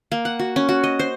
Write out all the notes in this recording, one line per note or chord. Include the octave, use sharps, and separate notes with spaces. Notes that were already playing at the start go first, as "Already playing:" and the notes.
A#3
F#5
F#4
C#4
F#4
D#5
C5